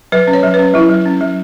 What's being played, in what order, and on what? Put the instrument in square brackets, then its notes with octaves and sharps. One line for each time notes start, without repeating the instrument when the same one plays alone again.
[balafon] F#3 B4
C#4
C#5
F#3
B4
C#4
F#3 E4
F#3
C#4
F#3